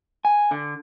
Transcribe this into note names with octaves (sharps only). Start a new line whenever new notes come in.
G#5
D3